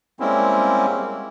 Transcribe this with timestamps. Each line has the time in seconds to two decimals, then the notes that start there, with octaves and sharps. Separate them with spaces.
0.20 G3 G#3 A#3 C4 C#4 E4